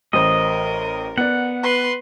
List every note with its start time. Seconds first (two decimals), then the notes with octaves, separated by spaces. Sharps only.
0.13 A1 A#4 C5 D#5
1.18 B3 D5 F#5
1.63 B4 C6